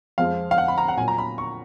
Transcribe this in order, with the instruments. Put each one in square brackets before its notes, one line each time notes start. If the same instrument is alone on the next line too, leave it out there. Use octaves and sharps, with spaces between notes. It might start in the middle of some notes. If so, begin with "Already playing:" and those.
[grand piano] F2 F3 G#3 F5
F5
F#5
B5
A#5
F#5
A#2 F#3 G#5
A#5
B5
C#6